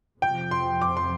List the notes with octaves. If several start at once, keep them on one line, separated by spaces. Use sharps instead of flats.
F2 C3 F3 G5
C6
D6
C6